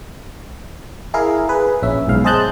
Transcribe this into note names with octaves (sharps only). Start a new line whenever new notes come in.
E4 G#4 A#4 F5
G#4 B4
A#1 C#4 E5
B1 G#2 F5
G#4 C5 D#5 A5 F#6 G6